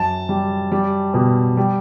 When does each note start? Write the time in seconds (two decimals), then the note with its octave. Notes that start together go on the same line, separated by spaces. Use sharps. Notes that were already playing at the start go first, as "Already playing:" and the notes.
Already playing: F#2 A5
0.29 G3
0.72 G3
1.14 B2
1.57 G3